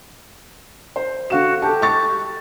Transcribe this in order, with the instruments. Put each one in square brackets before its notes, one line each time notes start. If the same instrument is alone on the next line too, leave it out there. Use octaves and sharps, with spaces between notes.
[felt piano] C5
[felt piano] D3 F5 E7 [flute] F#4
[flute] G4 [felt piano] A4 A5
[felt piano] C#6 A6